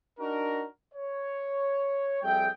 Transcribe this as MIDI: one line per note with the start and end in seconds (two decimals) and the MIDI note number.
0.19 0.64 62
0.19 0.64 63
0.19 0.64 66
0.19 0.64 70
0.94 2.21 73
2.22 2.49 41
2.22 2.49 55
2.22 2.49 68
2.22 2.49 76
2.22 2.49 79